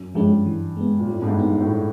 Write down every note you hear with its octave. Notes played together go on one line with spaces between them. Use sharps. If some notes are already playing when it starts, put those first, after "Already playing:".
Already playing: F#2
G2 F3 G#3 C#4
E3
G#3 B3
A#2
A2 G3
G#2
G2
B3 D#4
G2
A2